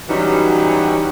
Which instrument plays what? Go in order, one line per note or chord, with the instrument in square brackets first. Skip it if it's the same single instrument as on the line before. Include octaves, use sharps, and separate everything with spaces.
[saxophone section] E3 F#3 G3 C#4 D#4 F#4